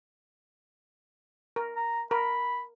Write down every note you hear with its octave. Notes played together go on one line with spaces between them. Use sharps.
A#4
A#5
A#4 B5